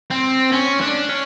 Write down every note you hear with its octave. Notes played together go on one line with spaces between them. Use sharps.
C4
C#4
D4
C#4